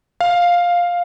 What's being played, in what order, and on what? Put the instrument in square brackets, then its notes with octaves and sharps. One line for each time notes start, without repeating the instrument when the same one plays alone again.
[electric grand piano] F5